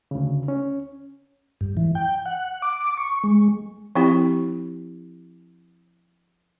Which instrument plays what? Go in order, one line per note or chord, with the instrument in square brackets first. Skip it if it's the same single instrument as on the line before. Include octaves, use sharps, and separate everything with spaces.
[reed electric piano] D2 C#3
C#4
[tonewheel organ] G2
E3
G5
F#5
D6
C#6
G#3
[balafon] F3 C4 E4 G4